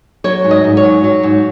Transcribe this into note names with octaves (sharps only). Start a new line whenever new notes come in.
F#3 C#5
G#2
D#5
G#2
C#5
F#3
F#3
G#2